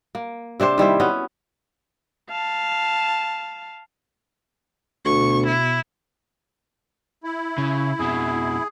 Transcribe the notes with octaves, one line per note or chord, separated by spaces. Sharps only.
A#3
C3 D4 G4 C5
D#3 G3 E4 C5
B3 C#4 F#4
F5 A5
D2 B2 C#6
E4
E4
C#3
F2 B2 G#4